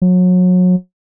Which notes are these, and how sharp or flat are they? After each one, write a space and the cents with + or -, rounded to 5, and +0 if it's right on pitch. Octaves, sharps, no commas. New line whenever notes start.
F#3 -30